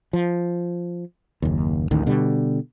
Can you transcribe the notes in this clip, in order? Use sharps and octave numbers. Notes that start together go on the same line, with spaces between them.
F3
F#1 D#2
A1 D2 D#3
B2 D3 G3